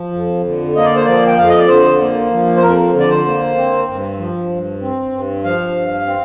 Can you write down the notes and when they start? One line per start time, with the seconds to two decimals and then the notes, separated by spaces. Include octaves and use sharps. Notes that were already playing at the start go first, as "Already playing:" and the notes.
Already playing: F3
0.13 F2
0.45 D3
0.76 A#3 D#5
0.85 D5
0.96 C5
1.05 F3 D5
1.27 G5
1.38 F2 F5
1.49 D#5
1.59 D5
1.69 D3 C5
2.00 A#3
2.31 F3
2.57 C5
2.63 F2 A#4
2.94 D3
3.00 D5
3.10 C5
3.25 A#3
3.57 C4
3.88 G2
4.18 F3
4.50 G2
4.81 C4
5.12 G2
5.44 F3 F5
5.75 G2
6.06 C4